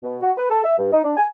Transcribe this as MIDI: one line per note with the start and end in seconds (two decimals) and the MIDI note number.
0.03 0.17 47
0.22 0.31 66
0.37 0.46 71
0.50 0.63 69
0.64 0.77 76
0.78 0.89 43
0.93 1.04 63
1.04 1.13 62
1.17 1.26 80